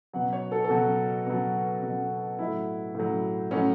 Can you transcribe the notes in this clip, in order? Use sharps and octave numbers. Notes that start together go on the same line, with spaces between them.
B2 F#3 F#5
C#5
A4
A4
B2 F#3 F#4
B2 F#3
B2 F#3
A2 F#3 E4
A2 F#3
A2 F#3 C#4